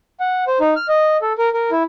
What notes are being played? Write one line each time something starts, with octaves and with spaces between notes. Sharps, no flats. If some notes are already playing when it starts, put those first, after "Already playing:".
F#5
C5
D#4
F6
D#5
A4
A#4
A#4
E4